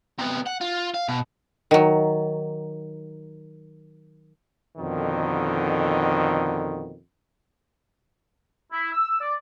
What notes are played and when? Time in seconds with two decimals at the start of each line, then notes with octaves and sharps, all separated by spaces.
0.19 C3 B3
0.47 F#5
0.61 F4
0.94 F5
1.08 B2
1.71 D#3 F#3
4.78 F2 B2 D3 D#3
8.72 E4
8.92 E6
9.20 D5